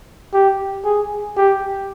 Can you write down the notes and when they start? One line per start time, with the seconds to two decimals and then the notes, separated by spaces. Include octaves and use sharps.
0.33 G4
0.85 G#4
1.37 G4